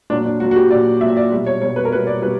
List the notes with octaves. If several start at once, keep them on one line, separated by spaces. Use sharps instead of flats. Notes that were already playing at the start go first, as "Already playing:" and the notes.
A#2 F#3 D4
D4
A#2 F#3 F#4
F#4
G4
A#2 F#3 D5
A#2 F#3 E5
D5
B2 G3
C#5
B2 G3 C#5
B4
A#4
B2 G3 B4
D5
B2 G3 B4